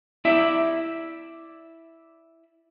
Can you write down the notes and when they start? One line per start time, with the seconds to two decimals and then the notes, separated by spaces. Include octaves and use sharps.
0.25 E4 D5 E5